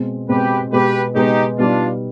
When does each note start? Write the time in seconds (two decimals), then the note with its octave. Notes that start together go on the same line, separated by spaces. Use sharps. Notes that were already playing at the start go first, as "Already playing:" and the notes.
Already playing: B2 G#3 C4
0.29 B2 G#3 C4 G4 B4
0.72 B2 G#3 B3 G4 B4
1.15 B2 G#3 B3 D#4 G4
1.58 B2 G3 B3 D4 D#4 F4